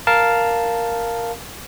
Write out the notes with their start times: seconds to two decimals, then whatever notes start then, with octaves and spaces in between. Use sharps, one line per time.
0.07 A#4 F5 A5